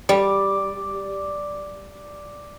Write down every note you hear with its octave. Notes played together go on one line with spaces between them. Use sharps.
G3 D5